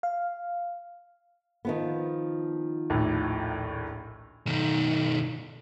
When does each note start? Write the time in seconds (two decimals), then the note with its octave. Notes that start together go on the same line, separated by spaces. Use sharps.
0.03 F5
1.65 D#3 F3 B3
2.90 A#1 D#2 A2
4.46 B1 D#3